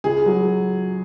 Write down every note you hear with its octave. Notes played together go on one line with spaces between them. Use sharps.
C#2 G#4
F#3